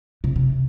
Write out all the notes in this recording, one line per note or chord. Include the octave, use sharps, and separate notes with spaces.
C3
C3